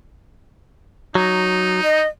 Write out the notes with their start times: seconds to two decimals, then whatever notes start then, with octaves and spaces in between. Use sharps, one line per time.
1.15 F#3 D#4
1.84 D#5